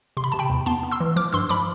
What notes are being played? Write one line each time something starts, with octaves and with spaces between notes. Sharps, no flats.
C3 C6
B5
C3 A5
G5 B5
E2
B3 A5 C6
B3
C6 E6
E3
F3 D6 F6
G2 C6 E6
F3 B5 D6